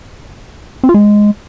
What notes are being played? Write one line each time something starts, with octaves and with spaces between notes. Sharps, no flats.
C4
F4
G#3